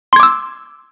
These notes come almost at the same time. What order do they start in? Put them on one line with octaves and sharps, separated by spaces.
C6 G#6 D6 E6